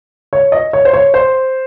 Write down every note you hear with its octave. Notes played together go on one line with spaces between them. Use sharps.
C#5
D#5
C#5
C5
C#5
C5